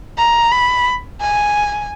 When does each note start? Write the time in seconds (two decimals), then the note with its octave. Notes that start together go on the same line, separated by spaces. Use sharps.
0.18 A#5
0.51 B5
1.20 G#5